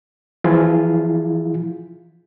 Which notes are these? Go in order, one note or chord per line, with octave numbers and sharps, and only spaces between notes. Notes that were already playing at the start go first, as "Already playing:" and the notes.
E3 F3 E4 F4 G#4